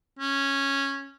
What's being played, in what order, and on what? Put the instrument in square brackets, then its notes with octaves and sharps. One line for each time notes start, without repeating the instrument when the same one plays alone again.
[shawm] C#4